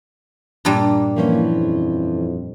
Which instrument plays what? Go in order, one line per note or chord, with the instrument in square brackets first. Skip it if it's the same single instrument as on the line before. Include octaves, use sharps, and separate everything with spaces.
[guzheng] G2 A#2 G3
[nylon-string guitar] E3 F3 C#4 [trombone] A#3
[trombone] F2